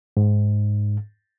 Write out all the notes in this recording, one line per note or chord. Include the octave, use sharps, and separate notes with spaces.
G#2